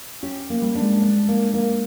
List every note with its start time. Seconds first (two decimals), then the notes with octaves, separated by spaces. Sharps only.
0.23 C#4 G4
0.50 A#3
0.62 G3
0.75 D4
0.82 G#3
1.02 D4
1.28 A#3
1.53 A#3